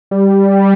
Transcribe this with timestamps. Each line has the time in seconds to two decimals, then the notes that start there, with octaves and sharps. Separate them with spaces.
0.11 G3